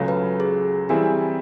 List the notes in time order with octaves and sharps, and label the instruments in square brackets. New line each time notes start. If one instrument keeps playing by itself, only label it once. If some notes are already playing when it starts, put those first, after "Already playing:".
Already playing: [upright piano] C#2 C#3 F#3 A3
[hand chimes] B4
G#4
[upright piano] E3 G3 C4 E4 G#4 [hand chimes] G4